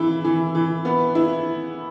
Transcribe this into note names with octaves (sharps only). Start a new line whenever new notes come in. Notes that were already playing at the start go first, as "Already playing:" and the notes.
Already playing: E3 E4
E3
E3
B3
E4